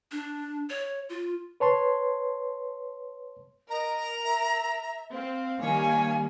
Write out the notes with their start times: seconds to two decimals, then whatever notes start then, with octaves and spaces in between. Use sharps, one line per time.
0.12 D4
0.70 C#5
1.09 F4
1.60 B4 C#5 A5 C6
3.70 A#4 D#5 A#5
4.23 E5
5.13 C4 F5
5.61 D#3 G3 A#3 C#5 G#5